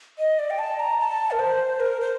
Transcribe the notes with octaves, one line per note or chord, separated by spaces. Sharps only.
D#5
D5
G5
A5
A#5
A5
A#4
C5
A#4
C5